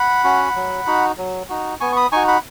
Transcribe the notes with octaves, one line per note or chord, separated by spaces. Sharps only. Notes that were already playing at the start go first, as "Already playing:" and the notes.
Already playing: F#5 B5
C#4 F#4
F#3
D#4 F#4
F#3
D#4 F#4
B3 G#5 C#6
C#6
B5 D#6
D#4 F#4 G#5 C#6
F#5 B5